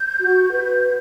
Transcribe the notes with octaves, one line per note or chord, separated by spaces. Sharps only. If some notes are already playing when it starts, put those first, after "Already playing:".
Already playing: G6
F#4
B4